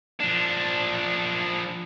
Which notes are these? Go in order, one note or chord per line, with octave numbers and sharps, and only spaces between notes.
F3 D4